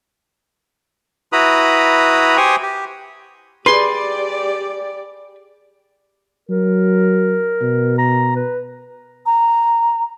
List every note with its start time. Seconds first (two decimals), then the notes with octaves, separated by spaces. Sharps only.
1.32 E4 F#4 B4 A#5 B5 D#6
2.37 G4 C5 G5 G#5 C#6 D#6
2.62 G4
3.66 G4 G#4 B4 D5 C6
6.49 F#3 A#4
7.61 B2
7.99 A#5
8.36 B4
9.26 A#5